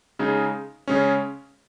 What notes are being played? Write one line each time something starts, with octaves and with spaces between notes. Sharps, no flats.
C#3 G#3 D#4 G#4
C#3 G#3 C#4